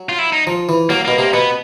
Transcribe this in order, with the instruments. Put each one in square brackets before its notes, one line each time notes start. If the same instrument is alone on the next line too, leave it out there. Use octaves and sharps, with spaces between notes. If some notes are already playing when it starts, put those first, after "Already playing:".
Already playing: [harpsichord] F#3
[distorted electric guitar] F4
E4
D#4
[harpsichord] F3
E3
[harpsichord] F#3 [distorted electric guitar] A#3
[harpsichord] B2 [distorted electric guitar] A#3
[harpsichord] C3 [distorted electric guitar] A#3
[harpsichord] B2 [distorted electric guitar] B3